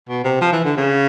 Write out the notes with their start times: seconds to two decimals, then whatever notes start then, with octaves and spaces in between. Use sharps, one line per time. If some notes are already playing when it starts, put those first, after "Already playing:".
0.09 B2
0.24 C3
0.41 F3
0.52 E3
0.65 D3
0.77 C#3